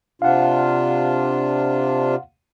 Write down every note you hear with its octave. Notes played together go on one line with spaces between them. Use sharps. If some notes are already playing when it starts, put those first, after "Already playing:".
C3 D4 F4 F5 F#5